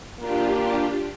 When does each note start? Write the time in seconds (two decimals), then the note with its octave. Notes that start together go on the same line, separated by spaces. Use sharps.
0.19 A#3 D4 F4 G4